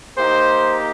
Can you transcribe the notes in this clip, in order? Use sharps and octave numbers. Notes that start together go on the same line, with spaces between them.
A#3 D#4 G4 C5